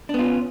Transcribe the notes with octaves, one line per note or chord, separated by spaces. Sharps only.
B3 C#4 D4 F4